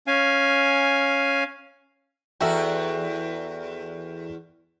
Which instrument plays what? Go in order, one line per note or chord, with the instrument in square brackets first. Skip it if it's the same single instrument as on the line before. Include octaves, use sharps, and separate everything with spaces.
[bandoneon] C#4 F5 G#5
[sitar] E2 F#4 [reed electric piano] A4 E5 G5